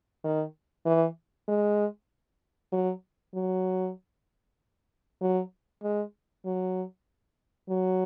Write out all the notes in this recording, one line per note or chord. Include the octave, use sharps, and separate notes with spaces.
D#3
E3
G#3
F#3
F#3
F#3
G#3
F#3
F#3